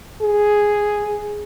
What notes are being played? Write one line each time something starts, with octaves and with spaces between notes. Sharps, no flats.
G#4